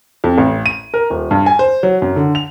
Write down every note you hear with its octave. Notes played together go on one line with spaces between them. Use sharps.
F2
A1
D#7
A#4
D#1
G2
G#5
C5
F#3
F#2
D3
F7